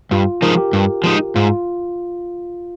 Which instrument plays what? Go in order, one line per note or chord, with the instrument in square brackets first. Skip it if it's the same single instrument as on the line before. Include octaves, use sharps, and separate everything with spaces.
[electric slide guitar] G2 [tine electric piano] F4
[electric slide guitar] F3 G#3 D#4 [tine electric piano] A#4
[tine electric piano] G4
[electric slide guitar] G2
F3 G#3 D#4
[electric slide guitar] G#2 [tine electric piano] F4